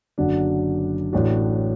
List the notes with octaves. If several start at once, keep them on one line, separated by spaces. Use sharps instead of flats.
F#1 F#2 D3 F#3 D4
A1 A2 A3 D4 F#4